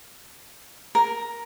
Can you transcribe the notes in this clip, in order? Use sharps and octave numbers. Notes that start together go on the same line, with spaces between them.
A#4